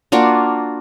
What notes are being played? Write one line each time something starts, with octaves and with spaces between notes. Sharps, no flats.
A#3 D4 F4 F#4